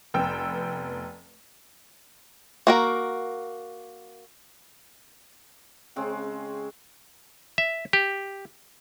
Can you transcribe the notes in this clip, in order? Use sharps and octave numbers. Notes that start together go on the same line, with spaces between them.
F1 B3 G5 E6
A#3 F#4 A#4
C#3 G#3 C4 C#4
E5
G4